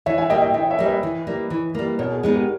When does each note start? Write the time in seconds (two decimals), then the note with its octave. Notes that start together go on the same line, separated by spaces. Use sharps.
0.06 E3 C#5 E5
0.18 E5 G#5
0.30 G3 A#3 D#5 G5
0.42 D#5 G5
0.54 E3 D#5 G5
0.70 C#5 E5
0.79 G3 A#3
0.86 B4 D#5
1.03 E3
1.27 G3 A#3
1.50 E3
1.75 G3 A#3
1.98 B2 A#4 C#5
2.11 G#4
2.23 G#3 B3 D#4
2.35 G4 A#4